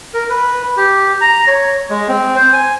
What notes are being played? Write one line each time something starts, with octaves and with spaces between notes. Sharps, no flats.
A#4
B4
G4
A#5
C#5
G#3
C4
C5
G#5